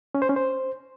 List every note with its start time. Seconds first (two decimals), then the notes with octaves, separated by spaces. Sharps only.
0.15 C#4
0.22 C5
0.29 C#4
0.36 C5